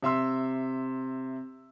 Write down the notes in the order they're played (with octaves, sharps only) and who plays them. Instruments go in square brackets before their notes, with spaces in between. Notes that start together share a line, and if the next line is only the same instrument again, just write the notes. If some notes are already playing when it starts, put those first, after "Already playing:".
[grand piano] C3 E5 C6 E6